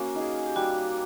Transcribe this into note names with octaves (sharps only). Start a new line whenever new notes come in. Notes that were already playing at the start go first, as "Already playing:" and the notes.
Already playing: A#3 C#4 F#4
D#4 G#4
G4
G3 F#4